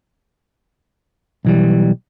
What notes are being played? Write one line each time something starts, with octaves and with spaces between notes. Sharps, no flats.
B1 E3 G3